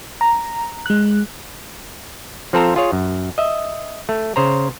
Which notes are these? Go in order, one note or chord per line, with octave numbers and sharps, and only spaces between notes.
A#5
G#3 F#6
F3 C4 F4 A4 C5 A#5
F4 G#4 C#5
F#2
D#5 E5
A3
C#3 C5 A#5